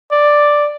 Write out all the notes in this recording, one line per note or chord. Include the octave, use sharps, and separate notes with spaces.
D5